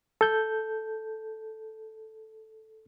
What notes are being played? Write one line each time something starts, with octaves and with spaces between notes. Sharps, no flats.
A4 G6